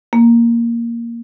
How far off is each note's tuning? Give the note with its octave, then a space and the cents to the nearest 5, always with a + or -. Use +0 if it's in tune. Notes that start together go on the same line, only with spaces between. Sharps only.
A#3 +0